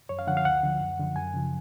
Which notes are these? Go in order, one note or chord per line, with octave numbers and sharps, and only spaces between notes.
F#2 C#5
F5
D3 F3 F#5
F5
D2 F#5
D3 F3
F#2
D3 F3
F#2 G#5
C#3 F3